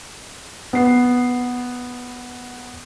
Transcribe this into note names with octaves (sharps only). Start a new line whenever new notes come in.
B3 C7